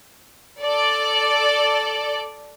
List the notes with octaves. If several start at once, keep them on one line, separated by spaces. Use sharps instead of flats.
A4 D5